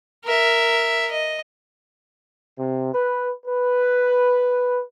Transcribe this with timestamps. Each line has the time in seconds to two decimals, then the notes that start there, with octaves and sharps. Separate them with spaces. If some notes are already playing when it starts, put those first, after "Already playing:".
0.25 A#4 E5
1.11 D#5
2.58 C3
2.93 B4
3.46 B4